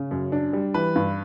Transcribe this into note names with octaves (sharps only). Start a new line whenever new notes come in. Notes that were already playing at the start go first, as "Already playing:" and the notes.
Already playing: C#3
F#2
D4
G3
E3 B4
G2